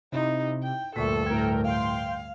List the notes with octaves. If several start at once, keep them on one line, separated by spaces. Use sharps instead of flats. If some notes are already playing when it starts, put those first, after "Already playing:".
C3 D#4 E4
G5
D2 G2 A#2 A4 E5 C#6 B6
A2 A#4 G5 G#6
F5 G5 C6